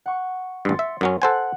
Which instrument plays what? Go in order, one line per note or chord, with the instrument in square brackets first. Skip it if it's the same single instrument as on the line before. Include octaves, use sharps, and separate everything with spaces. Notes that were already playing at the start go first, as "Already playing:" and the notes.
[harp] F#5 C#6
[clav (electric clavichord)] A1 G2 [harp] C6 A6 C#7
[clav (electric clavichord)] E5
F#2 F#3 C#4
[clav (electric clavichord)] A4 C5 G#5 [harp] F#5 F#6